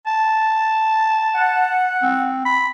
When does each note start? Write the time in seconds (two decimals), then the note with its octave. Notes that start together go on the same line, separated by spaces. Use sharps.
0.07 A5
1.35 F#5
2.02 C4
2.45 B5